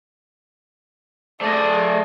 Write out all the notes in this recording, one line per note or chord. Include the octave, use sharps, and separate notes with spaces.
A3 G#4 D5 D#5